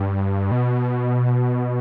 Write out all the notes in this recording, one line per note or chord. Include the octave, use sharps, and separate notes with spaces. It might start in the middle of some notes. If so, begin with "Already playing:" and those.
Already playing: G2
B2